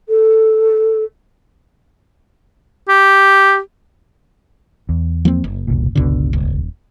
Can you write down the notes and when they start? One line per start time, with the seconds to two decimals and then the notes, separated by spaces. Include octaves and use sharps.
0.09 A4
2.89 G4
4.89 E2
5.25 F3 A#3 C4
5.44 F#1
5.67 E1 C2 A#2
5.95 G1 C#2 B2 D3
6.33 D#1